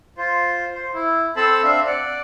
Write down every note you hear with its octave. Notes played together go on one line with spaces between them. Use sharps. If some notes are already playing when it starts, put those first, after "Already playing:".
F4 C5
C5
E4
C4 A4 C5 A5 B5 E6
C4 D4 E5 F5
D5 F#5